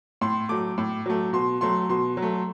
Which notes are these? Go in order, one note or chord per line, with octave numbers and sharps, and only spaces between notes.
A2 C6
F#3 A3 D6
A2
F#3 A3
B2 C6
F#3 A3 C6
B2 C6
F#3
A3